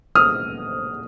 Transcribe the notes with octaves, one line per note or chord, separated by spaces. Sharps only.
D#6 F6